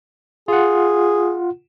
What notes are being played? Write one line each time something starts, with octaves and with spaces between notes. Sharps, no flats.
F4 G#4 F#5